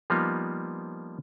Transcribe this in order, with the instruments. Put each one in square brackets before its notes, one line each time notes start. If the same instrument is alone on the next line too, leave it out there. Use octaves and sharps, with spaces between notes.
[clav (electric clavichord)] F3 G3 A#3 B3 D#4 F4